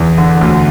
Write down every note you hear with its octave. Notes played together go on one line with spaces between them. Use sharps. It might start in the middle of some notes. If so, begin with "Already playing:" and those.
Already playing: E2
D3
D2